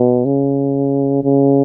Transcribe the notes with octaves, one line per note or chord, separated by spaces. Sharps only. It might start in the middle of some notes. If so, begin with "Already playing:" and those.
Already playing: B2
C#3
C#3